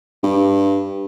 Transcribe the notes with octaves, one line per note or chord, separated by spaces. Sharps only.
G2